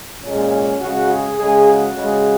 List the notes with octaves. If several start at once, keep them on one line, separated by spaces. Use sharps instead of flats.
A#2 G#3 C#4
C#3 G#3 F#4
G#4
C#3 G#3 G#4
F#4
C#3 G#3